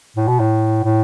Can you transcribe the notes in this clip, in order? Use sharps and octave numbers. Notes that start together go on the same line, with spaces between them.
A2
B2
A2
A2